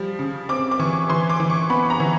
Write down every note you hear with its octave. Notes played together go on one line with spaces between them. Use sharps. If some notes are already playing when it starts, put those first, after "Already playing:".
Already playing: F3 G3
C#3
C4 D6
D6
E3 C#6
E3 C6
D6
E3
C#6
B3 B5
A#5
E3